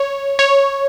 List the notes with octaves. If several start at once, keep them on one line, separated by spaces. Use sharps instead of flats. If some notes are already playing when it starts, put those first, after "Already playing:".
Already playing: C#5
C#5